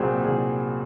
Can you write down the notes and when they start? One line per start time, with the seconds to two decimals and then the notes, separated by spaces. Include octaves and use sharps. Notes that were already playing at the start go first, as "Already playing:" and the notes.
Already playing: C2 A#2 F#3 C4 G#4
0.24 C2 G#4